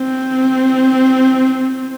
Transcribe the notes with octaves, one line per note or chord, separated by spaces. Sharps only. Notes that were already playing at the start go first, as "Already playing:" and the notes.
Already playing: C4